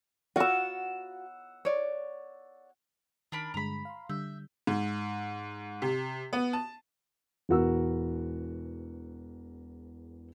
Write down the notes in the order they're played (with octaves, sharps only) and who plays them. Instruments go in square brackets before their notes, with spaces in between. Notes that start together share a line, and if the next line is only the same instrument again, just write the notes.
[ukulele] F4 F#4 [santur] F#5 E6
[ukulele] C#5 D5
[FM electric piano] D#3 [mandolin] D4 A#4 B5
[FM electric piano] G2 D3 G#3 [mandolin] A#5 B5
[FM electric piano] F5 C6
[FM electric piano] D3 G3 G6 [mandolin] E5
[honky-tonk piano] G#2
C3
B3
A5
[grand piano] E1 E2 E3 F#4 A#4 E6